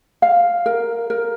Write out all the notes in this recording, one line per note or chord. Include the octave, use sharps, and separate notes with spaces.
F5
A#4
A#4